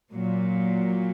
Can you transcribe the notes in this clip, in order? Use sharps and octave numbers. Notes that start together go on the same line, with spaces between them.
A#2 F#3